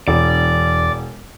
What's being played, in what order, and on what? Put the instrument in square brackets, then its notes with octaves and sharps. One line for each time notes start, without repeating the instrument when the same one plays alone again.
[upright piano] E1 [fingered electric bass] E2 [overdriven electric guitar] D5